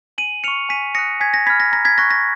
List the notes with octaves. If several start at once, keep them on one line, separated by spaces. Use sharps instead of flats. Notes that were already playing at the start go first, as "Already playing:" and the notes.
G#5 D#7 F#7
C#6 F6 C#7 F7
G#5 B6 D#7
D#6 F#6 A#6 C#7
G#5 G#6 B6
A#6
B5 F6 G#6 B6
A#6
A#5 A#6
G#6 B6
C#6 F#6 A#6
A#6